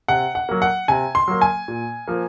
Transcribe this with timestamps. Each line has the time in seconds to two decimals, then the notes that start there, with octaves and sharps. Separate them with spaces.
0.08 C3 F#5
0.35 F#5
0.49 F#3 A#3
0.62 F#5
0.88 C3 G#5
1.15 C6
1.28 F#3 A#3
1.41 G#5
1.68 A#2
2.08 F3 A#3